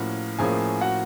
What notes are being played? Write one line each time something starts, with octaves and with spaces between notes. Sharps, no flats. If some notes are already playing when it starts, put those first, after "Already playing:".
Already playing: A2 F3 A#3 C#4 F#4
A2 F3 A#3 C#4 G#4 G#5
F#4 F#5